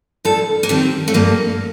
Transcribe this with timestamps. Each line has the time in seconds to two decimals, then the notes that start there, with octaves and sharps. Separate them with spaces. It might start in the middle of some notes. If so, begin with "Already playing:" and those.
0.25 G2 A4
0.63 A#3
0.69 D#3 G3 C4
1.08 A3
1.14 G2 A#3